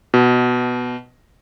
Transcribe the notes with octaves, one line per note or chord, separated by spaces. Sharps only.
B2